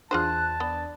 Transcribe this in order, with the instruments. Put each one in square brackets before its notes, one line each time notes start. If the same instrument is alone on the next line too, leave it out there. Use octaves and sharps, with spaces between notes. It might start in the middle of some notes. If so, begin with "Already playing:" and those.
[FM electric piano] E2 D4 [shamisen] F4 G#4 C5 [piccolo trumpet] A5 [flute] F#6
[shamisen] B3 [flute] D5